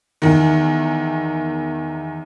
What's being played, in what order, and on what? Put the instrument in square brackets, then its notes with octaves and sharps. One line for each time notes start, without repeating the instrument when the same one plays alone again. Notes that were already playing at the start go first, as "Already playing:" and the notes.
[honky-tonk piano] E2 D#3